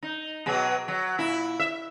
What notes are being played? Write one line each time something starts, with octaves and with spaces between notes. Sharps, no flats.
D#4
B2 F#3 G#4
F#3
A#2 E4
E5